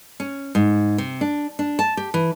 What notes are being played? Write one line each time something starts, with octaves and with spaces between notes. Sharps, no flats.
C#4
G#2
C3
D4
D4
A5
G4
E3